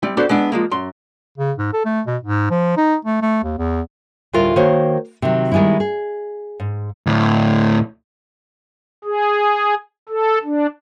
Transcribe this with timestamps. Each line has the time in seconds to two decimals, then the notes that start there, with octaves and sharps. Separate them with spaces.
0.03 G3 C4 E4
0.17 B3 D4 F#4 G4 A4 C5
0.29 G#3 B3 D4 E4
0.52 F3 G#3 A#3
0.71 F#2 C6
1.38 C#3
1.59 G#2
1.73 A4
1.85 A3
2.07 B2
2.23 G#2
2.50 F3
2.77 D#4
3.05 A3
3.22 A3
3.44 D#2
3.58 E2
4.33 D2 A2 G3 E4 F4 A#4
4.56 D#3 A#3 F#4 C5 C#5
5.22 C3 D#3 F#3
5.52 D#3 G3 G#3 B3 E4
5.80 G#4
6.60 G#2
7.07 D2 A2
9.05 G#4
10.09 A4
10.44 D4